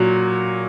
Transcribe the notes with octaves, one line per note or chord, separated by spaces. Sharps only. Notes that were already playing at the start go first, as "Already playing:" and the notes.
Already playing: A#2 F#3 F#4